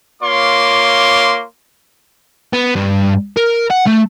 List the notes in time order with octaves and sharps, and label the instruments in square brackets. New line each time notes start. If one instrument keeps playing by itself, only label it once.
[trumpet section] A#3 F4 C#5 C6 D6
[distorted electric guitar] B3
G2
A#4
F#5
A3